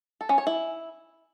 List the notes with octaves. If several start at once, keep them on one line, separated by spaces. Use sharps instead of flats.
A4
C#4
C#5
E4